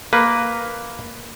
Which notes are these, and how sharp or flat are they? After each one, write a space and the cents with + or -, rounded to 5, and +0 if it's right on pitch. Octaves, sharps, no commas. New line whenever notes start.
A#3 +0 B4 +0